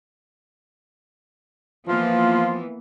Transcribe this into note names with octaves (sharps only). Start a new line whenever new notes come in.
E3 F3 A#3 B3 F4